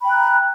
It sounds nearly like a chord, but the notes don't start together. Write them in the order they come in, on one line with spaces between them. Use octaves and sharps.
B5 G5 F#6 A#5